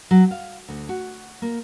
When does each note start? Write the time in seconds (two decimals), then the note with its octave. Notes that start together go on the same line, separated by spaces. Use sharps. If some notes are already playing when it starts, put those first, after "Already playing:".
0.11 F#3
0.31 F5
0.69 D2
0.89 F#4
1.42 A#3